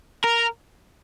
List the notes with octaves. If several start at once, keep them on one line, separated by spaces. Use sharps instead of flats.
A#4